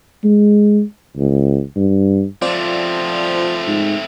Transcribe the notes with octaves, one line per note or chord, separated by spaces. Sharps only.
G#3
C#2
G2
F3 A3 C4 F4 C5 D5
G#2